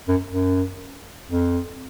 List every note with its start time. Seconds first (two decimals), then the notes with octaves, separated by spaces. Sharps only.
0.08 F#2
0.33 F#2
1.31 F2